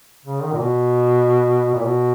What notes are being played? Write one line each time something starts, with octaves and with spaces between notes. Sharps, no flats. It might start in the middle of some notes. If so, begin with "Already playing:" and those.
C#3
D#3
A#2
B2
A#2
B2